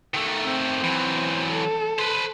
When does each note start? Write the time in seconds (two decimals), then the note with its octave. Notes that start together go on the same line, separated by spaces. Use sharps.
0.14 D#3 A3
0.45 C4 C5
0.84 E3 F#3
1.52 A4
1.99 B4 C5